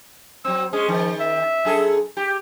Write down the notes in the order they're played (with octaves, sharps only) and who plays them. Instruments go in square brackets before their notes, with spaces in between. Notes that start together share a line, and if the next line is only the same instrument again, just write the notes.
[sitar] F#3 C4 [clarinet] E6
[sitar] G#3 C#4 [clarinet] G#4
[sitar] D#3 [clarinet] F3
[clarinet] E5
[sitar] F#2 G#4 A4
G4